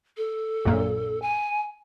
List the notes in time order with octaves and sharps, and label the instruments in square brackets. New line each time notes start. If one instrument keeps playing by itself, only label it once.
[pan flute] A4
[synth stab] A#1 F#2 A#2
[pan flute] G#5